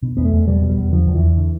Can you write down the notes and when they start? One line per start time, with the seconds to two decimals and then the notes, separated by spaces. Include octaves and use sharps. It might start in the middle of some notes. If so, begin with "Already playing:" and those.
0.02 B2
0.17 E2 B3
0.25 A3
0.33 E2
0.47 B2 G3
0.62 B2
0.70 G3
0.78 E2
0.92 D3 F3
1.07 E2
1.15 E3
1.23 E2
1.37 D3